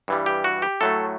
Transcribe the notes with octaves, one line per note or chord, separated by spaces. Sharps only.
G2 E3 G3
G4
F#4
G4
A2 F#3 A3 A4